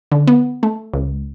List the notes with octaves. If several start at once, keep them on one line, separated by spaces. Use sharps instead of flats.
D3
B3
A3
C#2